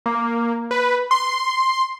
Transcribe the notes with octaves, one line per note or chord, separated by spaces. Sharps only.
A#3
B4
C6